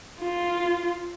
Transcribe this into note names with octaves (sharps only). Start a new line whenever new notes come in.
F4